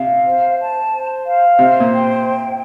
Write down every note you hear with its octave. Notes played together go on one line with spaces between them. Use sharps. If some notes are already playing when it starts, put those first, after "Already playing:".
Already playing: C3 F5
C5
A5
C5
F5
C3 C5
A#2
G5